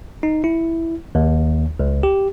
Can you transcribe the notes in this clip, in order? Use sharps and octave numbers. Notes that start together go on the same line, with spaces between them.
D#4
E4
D#2
C#2
G4